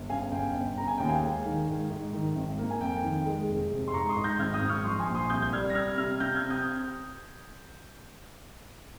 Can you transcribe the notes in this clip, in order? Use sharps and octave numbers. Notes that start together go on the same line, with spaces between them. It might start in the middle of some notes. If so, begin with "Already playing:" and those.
Already playing: G1
C#3 F5 G#5
G1 G5
G1
C#3 A#5
G#5
D#2 G5
F5 G#5
G#3
D#3
G#2
G#2
D#3
G#1
A#3
G#5
F2 G5
D#3
G#3
F1
F1
C6
G#2 A#5 C#6
C6 D#6
G#2
G6 A#6
G#1 F6 G#6
D#6 G6
G#1
C#6 F6
F3 C6 D#6
G#5 C6
A#1
C6 D#6
C2 D#6 G6
G6
G3 F6 G#6
A#6
C3 F6 G#6
C3 F6 G#6
C3 G6 A#6
F6 G#6
C4
D#6 G6